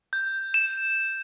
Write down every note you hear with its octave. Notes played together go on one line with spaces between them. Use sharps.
G6
E7